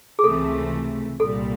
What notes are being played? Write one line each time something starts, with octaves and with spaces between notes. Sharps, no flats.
G#4
C#2 C3 E3 A3 A4
C2 A#2 G3 A4